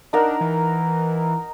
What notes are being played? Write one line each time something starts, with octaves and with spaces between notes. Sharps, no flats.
D4 D#4 A#4 F#5
E3